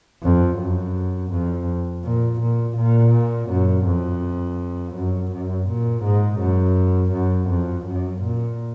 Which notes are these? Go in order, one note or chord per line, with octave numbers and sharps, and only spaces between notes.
F2
F#2
F2
A#2
A#2
A#2
F#2
F2
F#2
F#2
A#2
G#2
F#2
F#2
F2
F#2
A#2